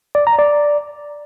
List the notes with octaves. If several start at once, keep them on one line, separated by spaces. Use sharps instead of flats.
D5
A#5
D5